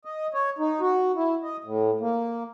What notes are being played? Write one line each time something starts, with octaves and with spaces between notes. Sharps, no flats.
D#5
C#5
D#4
F#4
E4
D#5
A2
A#3